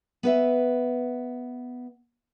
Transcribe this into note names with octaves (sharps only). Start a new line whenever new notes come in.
B3 B4 E5